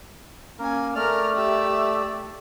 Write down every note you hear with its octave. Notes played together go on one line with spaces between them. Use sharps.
A#3 C#4 A#4 G#5
A3 A#4 D5 F6
G4 E5